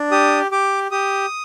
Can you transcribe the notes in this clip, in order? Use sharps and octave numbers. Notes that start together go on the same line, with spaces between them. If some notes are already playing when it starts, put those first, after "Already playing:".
Already playing: D4
G4 D#6
G4 D6
G4 D#6